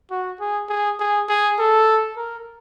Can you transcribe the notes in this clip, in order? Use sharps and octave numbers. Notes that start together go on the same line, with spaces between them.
F#4
G#4
G#4
G#4
G#4
A4
A#4